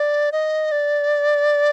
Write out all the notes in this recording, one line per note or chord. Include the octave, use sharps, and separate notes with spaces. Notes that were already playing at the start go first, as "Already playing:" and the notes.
Already playing: D5
D#5
D5